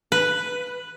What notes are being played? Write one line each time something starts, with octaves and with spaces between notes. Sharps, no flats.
B4